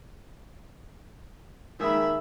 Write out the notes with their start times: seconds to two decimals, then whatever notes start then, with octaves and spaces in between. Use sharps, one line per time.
1.80 D#3 G#3 A#3 E5 B5